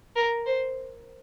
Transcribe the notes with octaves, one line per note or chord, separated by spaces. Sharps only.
A#4
C5